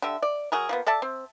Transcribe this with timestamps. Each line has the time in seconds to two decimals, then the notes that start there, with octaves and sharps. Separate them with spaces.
0.02 D3 G4 E5
0.22 D5
0.52 F#3 G#4 A#4
0.69 F3 A#3 B3
0.86 A4 D5 E5 A5
1.02 C4